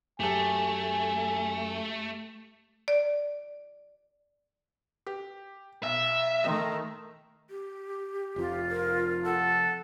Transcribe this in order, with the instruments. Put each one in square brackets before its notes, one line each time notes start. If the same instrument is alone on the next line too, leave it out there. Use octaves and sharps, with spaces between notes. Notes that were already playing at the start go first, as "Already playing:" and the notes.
[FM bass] F#2 [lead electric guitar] A3 [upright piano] G4 A4 [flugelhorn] G#5
[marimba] D5
[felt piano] G4
[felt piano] B1 [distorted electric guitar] E5
[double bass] D#3 A3 [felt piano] D#5 G5 C6
[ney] G4
[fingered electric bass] F1 F2 [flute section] F4
[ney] A#4
[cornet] A4 [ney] F#5